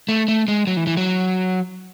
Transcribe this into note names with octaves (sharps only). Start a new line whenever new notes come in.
A3
A3
G#3
F#3
E3
E3
F#3